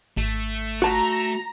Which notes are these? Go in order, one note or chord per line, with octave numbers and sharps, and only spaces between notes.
G#1 A3
F#4 A5 A#5